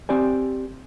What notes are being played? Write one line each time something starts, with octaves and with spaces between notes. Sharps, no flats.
C4 G4 D5 G#5